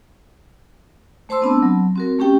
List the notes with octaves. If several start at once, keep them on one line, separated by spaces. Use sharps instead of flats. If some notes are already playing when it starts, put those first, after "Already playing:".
A3 C5 A5 C6 E6
B3 C4 D4 A5 B5
F#3
C4 F#4 A#4
A3 C#4 G4 G5